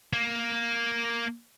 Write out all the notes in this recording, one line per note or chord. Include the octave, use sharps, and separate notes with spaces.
A#3